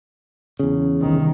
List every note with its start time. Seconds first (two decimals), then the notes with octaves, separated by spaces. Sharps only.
0.59 E2 C#3
1.00 C2 D#3